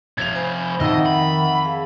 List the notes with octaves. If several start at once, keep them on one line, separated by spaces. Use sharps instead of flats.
C3 F3 C#5 G#6 F7
C5 G#5 B5
F2 D#3 D#5 E5 F#5 E6
B5
G#4 F5